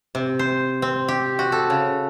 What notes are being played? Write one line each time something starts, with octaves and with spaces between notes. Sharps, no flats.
C3
C5
C4
G4
F#4
A4
C#3